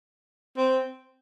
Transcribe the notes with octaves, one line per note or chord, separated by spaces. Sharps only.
C4